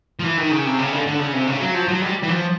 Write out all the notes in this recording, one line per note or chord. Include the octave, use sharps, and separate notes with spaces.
F3
E3
D#3
C#3
C3
C#3
D3
D3
C#3
C3
C#3
F#3
F3
F#3
G3
E3
F3